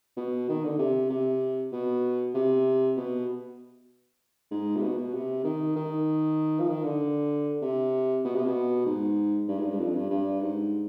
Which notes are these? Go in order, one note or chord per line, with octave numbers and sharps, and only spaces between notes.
B2
D#3
D3
C3
C3
B2
C3
B2
G#2
C3
B2
B2
C3
D#3
D#3
F3
D#3
D3
C3
B2
C3
B2
G#2
G2
G#2
G2
F2
G2
G2
G#2